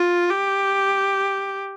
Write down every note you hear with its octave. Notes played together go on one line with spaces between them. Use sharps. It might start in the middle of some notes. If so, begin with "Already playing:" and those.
Already playing: F4
G4